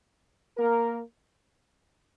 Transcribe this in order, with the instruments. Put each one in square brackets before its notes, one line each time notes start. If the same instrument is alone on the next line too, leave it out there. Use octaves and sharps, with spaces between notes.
[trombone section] A#3 A#4